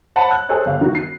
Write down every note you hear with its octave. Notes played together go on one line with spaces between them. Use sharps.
C5 C#5 F#5 A5 B5
F#6
G#4 A4 C5 C#5 D#5
G1 F5
D#3 F#4
C7